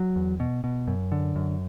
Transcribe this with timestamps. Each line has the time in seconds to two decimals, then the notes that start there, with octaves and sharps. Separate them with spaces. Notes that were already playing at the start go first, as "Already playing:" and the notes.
Already playing: F#3
0.16 E2
0.40 B2
0.64 B2
0.88 F#2
1.12 D3
1.36 F#2